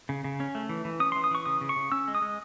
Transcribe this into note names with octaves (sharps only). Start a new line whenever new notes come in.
C#3
C#3
C#4
A3
E3
E3
C#4 D#6
E3 C6
D#6
E3 C#6
C#3 D#6
C#3
C#6
C#3
C#4 E6
G#3
D#6
G#3